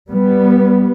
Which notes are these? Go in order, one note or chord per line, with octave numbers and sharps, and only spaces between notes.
G3 B3